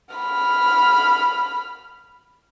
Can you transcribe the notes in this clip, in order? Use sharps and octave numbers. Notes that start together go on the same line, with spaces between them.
B5 F6